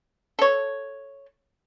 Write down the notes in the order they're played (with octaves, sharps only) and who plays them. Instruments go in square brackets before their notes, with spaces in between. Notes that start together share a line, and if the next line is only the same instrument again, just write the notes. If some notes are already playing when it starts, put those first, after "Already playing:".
[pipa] A4 C#5